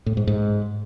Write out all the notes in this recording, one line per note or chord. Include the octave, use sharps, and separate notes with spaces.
A2
G#2
G#2